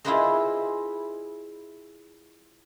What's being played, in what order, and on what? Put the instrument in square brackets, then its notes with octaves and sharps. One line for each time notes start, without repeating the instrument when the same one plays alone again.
[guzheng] E4 F4 G#4 B4 C5 D#5